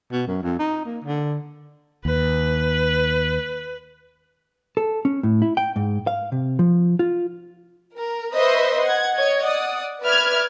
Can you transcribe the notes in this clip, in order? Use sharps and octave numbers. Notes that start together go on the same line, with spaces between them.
B2
F#2
F2
D#4
A#3
D3
D#2 B4
A4
C#4
A2
E4
G5
G#2
F5
C3
F3
F4
A#4
B4 C5 D#5 E5 C6 C#6
F#5 G#6
C#5 D#5 G#6
D5 F#5 D#6
B4 D5 E5 F6 G#6